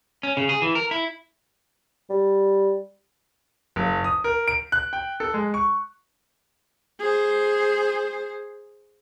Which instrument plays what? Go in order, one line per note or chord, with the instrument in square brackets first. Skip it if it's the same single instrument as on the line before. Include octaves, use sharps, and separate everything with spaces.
[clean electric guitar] C#4
C#3
G#4
E3
A#4
E4
[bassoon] G3
[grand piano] F#1
D#6
A#4
D7
F#6
G5
A4
G#3
C#6
[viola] G#4 C5